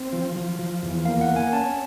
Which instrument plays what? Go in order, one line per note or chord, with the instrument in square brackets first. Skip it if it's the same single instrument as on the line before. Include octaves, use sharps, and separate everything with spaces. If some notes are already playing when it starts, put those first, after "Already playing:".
Already playing: [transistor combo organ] C4
F3
F3
F3
E2
[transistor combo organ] A#3 [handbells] F5
[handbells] F#5
[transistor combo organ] A#3
[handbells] G#5
[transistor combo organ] C#4 [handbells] A5